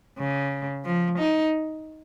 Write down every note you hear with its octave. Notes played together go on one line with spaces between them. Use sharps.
C#3
F3
D#4